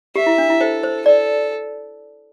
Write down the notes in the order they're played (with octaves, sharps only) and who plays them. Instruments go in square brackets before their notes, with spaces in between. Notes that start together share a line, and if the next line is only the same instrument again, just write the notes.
[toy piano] G4 [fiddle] E5
[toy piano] E4
D4
E4
[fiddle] A4 [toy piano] C5
[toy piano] C5
[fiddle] A4 [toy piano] D5